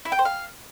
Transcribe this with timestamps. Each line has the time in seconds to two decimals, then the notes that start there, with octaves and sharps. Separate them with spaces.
0.05 E4
0.12 G5
0.19 C5
0.25 F5